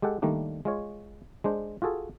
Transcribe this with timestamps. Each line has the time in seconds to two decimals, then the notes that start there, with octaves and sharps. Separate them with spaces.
0.02 G#3 G4 A4 F#5
0.22 D#3 G3 A3 A#3 D4
0.65 G#3 F4 C#5
1.44 G#3 D4 C5
1.82 F4 F#4 G#4 A4